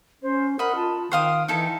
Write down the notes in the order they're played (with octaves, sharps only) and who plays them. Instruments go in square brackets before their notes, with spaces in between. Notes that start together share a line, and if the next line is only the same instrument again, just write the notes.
[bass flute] C#4 [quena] C5
[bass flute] A#4 [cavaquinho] D#5 B5 [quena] F#5
[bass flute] F4 [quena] A5
[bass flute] D#3 [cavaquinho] C5 F5 D#6 [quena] G5
[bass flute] E3 [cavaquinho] D#4 E4 A4